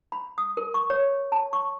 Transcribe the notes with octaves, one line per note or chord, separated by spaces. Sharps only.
B5
D#6
A#4
C#6
C#5
A5
C#6